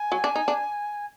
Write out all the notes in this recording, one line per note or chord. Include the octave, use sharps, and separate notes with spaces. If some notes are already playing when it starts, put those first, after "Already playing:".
Already playing: G#5
F#3
D4
D#4
D4